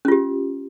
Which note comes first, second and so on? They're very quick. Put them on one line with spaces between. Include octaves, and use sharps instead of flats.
C#4 F4 G4